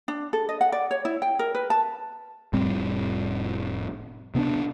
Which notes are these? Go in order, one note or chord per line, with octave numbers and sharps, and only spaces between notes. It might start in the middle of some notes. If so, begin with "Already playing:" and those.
D4
A4
D#5
F#5
D5
C#5
E4
G5
A#4
B4
A5
F1 A2 G3 C4
C3 B3 C#4 D4